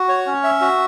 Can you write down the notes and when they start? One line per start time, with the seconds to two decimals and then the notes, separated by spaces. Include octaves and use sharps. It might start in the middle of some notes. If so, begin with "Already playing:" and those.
Already playing: F#4
0.09 C#5
0.26 C#4
0.44 E5
0.61 F#4